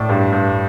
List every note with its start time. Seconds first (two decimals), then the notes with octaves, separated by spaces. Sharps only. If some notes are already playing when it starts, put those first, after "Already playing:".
Already playing: A2 D5
0.09 G2
0.32 G2